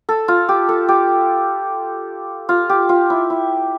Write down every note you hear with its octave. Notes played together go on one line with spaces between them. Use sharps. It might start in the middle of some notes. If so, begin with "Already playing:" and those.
A4
F4
G4
A4
G4
F4
G4
F4
E4
E4